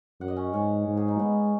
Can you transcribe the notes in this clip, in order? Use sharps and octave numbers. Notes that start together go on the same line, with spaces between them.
F#2 F#5
D#5
C#4
G#2 C#4
G#2
G#4
D#4
G#3 B3